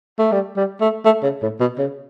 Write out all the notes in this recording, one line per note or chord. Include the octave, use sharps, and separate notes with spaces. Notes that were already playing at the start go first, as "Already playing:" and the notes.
A3
G3
G3
A3
A3
C#3
A2
B2
C#3